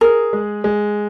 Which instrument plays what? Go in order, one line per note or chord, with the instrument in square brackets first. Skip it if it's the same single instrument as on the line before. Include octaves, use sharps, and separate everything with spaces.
[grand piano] G#4 [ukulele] A#4
[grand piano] G#3
G#3